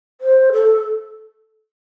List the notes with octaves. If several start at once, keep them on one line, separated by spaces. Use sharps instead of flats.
C5
A4